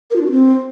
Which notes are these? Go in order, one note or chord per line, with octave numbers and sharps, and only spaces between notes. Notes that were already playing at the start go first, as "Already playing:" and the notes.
A#4
F4
D4
F#4
C4